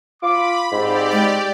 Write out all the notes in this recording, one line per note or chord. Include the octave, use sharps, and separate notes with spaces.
F4 B5 D6
G#2 C4 F4 G4 D5 B5
G#3